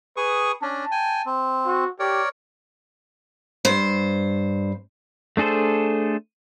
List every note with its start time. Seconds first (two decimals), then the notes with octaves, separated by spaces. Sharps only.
0.17 G#4 B4 C#6 D#6
0.62 C#4 D4 A5
0.91 G5 G#5
1.26 C4
1.66 F#4
2.00 G4 A#4 C#5 D5
3.65 G2 C5
5.37 A3 D4 G#4 A4 C5